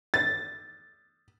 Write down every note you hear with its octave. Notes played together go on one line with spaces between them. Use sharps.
A6